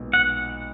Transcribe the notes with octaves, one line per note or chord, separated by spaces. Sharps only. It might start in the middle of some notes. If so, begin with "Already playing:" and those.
Already playing: B1 A#2 G#3 B3
F#5